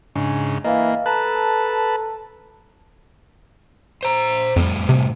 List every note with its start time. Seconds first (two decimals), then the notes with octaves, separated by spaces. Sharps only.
0.15 G#2 C#3 D4
0.64 E3 A#3 D#5 F5
1.06 A4 B4 A5 A#5 F#6
4.03 C5 A#5
4.56 F2 A2 G3
4.89 C3